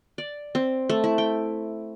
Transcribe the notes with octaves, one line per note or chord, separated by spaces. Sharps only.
D5
C4
A3
E4
G5